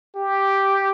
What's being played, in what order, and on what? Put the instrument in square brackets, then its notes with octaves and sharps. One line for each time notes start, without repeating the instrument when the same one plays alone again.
[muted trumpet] G4